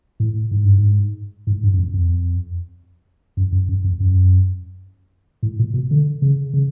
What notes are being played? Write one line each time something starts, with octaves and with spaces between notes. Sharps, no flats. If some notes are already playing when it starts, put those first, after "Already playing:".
A2
G#2
G2
G#2
G#2
G2
F#2
F2
F2
F#2
F#2
F#2
F2
F#2
A2
A#2
B2
D3
C#3
C#3